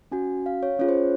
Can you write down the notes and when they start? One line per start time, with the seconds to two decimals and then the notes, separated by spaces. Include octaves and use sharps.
0.12 C#4 F#4 G#5
0.46 F5
0.63 C#5
0.79 C#4 F4 G#4 C#5
0.89 C5